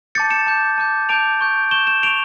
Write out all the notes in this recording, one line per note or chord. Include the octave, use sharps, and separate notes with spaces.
A5 D6 G6 A6 C#7
C#7 E7
A5 D6 G6
A5 D6 G6
A5 D6 G6 D7 F7
C#6 G6
C#6 G6 E7 G7
E7 G7
C#6 G6 D7 F7